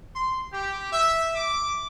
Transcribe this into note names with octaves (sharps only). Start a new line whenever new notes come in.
C6
G4
E5
D6